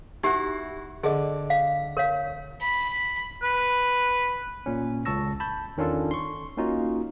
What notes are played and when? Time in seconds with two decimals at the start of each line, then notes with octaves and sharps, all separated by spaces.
0.24 D#4 E4 F#4 G4
1.04 D3 G#4 D#5
1.50 F5
1.97 A#4 C#5 F5
2.61 B5
3.42 B4
4.66 A#2 C#4
5.05 C#2 A5 C#6 E6 A#6
5.40 A5 B5 G6
5.77 E2 D#3 C#4 D4 F4 A4
6.11 C6 C#6
6.57 A#3 C#4 D#4 F4 F#4